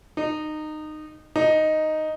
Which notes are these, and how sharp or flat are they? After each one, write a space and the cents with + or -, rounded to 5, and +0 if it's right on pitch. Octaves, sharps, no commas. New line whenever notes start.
D#4 -20
D#4 +0